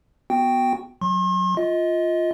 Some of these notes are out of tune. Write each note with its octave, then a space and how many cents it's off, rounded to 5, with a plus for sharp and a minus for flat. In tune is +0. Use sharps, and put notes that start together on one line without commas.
B3 +0 F#4 +0 G5 +0
F#3 +0 C6 +45
F4 +0 D#5 +25